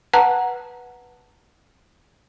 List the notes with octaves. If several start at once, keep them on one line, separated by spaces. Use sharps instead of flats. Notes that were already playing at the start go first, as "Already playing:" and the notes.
B4 F#5 A5 A#5 F#6